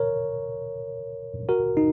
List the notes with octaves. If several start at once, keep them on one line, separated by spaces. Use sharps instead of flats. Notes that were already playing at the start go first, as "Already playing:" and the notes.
Already playing: A#4 C#5
F#4 A#4
D#4